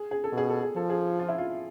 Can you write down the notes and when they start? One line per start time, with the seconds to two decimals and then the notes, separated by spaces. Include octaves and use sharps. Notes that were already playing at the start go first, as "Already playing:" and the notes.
Already playing: G#4
0.11 G#4
0.24 A4
0.32 B2
0.38 G#4
0.50 A4
0.63 G#4
0.76 F3 A4
0.90 G#4
1.19 F4
1.29 E4
1.38 F4